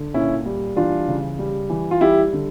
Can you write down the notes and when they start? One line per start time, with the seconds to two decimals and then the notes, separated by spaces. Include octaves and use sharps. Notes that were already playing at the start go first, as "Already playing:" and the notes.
Already playing: D3
0.14 A#2 C#4 E4
0.46 G3
0.77 E3 D4 F4
1.08 C#3
1.39 G3
1.70 E3
1.91 F4
2.01 G3 E4 G4
2.33 D3